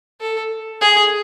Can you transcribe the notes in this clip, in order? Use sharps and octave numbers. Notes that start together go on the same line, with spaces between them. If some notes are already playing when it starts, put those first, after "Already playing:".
A4
G#4